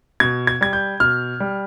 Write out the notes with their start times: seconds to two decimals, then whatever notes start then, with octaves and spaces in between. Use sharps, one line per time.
0.20 B2 G#6
0.47 G#6
0.61 G3 G#6
0.73 G6
1.00 B2 F6
1.40 G3